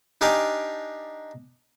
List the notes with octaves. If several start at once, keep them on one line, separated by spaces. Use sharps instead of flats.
D4 D#4 G4 F5 G#5 D6